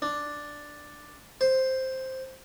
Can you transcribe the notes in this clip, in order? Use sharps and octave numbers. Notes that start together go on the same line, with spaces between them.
D4
C5